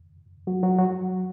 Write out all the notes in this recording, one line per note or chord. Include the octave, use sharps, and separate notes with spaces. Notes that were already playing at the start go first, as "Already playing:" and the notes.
F#3 F#4
F#3 F#4
F#3 F#4